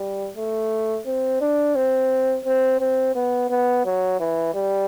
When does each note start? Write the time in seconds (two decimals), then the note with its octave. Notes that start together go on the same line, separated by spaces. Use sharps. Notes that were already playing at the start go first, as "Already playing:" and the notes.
Already playing: G3
0.37 A3
1.06 C4
1.41 D4
1.75 C4
2.45 C4
2.80 C4
3.15 B3
3.50 B3
3.85 F#3
4.20 E3
4.55 G3